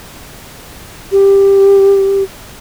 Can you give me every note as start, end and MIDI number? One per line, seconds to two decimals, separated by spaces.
1.12 2.23 67